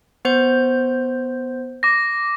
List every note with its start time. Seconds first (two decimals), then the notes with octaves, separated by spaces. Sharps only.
0.25 B3 C5 G6
1.83 D6 A#6